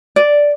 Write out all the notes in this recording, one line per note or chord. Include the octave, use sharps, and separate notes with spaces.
D5